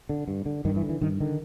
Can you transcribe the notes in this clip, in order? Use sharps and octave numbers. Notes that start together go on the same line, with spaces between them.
D3
G2
D3
G2 D#3
E3
D3
E3
G2 D#3
D3 D#3